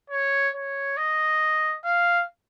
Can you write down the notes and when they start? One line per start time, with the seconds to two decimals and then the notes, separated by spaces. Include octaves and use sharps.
0.10 C#5
0.55 C#5
0.97 D#5
1.85 F5